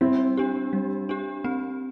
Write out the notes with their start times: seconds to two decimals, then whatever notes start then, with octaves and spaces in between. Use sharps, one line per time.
0.01 G3 C4 E4
0.37 D4 G4
0.73 G3
1.09 D4 G4
1.45 C4